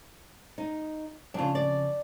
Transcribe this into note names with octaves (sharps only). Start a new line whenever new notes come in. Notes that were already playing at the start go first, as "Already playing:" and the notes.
D#4
F2 C#3 D4 F4
D5